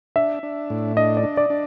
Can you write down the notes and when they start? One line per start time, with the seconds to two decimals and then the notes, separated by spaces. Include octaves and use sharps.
0.16 D4 E5
0.43 D4
0.70 A2
0.97 D4 D#5
1.17 D5
1.23 D4
1.37 D5
1.50 D4